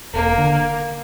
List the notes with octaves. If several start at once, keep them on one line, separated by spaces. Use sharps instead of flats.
E1 A#3
D3